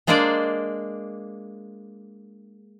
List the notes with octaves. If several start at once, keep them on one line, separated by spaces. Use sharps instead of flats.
G#3 A#3 D4 G#4 C5 D5